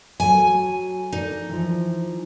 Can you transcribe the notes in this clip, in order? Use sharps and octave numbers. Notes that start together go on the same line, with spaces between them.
F#3 A4 G#5
D#4 A4 D5
E3 F3